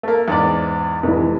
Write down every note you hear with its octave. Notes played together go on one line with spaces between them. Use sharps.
A3 A#3
E2 G#2 D5
F1 G#2 E3